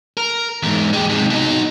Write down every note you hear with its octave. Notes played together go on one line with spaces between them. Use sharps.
A#4
E2 G#2
G#3 G4
G#2 C3
B2 D#4